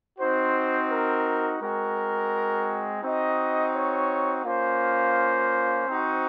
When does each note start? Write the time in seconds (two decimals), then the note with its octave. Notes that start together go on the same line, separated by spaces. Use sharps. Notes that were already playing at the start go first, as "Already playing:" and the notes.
0.18 C4 D#4 F#4 C5
0.90 A#4
1.60 G#3 C4 F#4 A#4
3.02 C4 D#4 F#4 D#5
3.73 C#5
4.44 A#3 C#4 F4 C5
5.86 C4 D#4 F#4